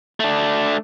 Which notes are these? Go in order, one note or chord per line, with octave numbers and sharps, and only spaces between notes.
A3 D4